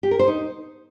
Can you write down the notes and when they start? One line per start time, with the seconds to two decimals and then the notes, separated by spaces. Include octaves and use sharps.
0.03 G4
0.11 A#4
0.19 C5
0.28 D#4